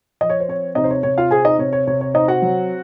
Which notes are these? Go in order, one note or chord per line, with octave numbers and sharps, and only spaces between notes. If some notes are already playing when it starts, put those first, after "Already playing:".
F3 D#5
C#5
C5
C4 C#5
C3 D#4 D#5
C5
C#5
C3 C#5
F4 F5
C4 G#4 G#5
D#4 D#5
C3 C#5
C#5
C3 C#5
C#5
C4 D#4 D#5
F#4 F#5
F#3